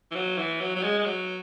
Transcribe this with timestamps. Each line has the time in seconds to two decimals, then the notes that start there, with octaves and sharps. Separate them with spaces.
0.11 E3
0.15 F#3
0.38 E3
0.61 F#3
0.76 F#3
0.83 G#3
0.98 G#3
1.06 F#3